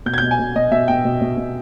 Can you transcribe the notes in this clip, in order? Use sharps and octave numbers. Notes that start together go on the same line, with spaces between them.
B2 G6
G#6
B2 G6
G#5
B2
B2 D#5
B2 E5
B2 G5
B2
B2
B2